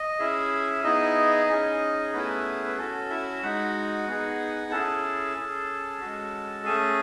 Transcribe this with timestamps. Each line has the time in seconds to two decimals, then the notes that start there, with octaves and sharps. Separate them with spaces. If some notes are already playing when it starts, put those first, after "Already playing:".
Already playing: D#5
0.19 C#4 E4 G#4 E5
0.84 B3 D#4 E4 G#4 D#5
1.49 C#4 G#4
2.13 A3 B3 C#4 E4 G#4 B4
2.66 B4
2.78 C#4 F#4 A4
3.10 E4 E5
3.42 G#3 D#4 F#4 F#5
4.08 B3 D#4 G#4
4.71 C#4 E4 G#4 A4 A5
5.36 C#4 G#4
6.01 G#3 C#4 F#4
6.65 A3 C#4 G#4 G#5